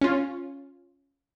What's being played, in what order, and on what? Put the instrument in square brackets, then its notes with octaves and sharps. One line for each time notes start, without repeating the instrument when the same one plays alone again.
[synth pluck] C#4 F4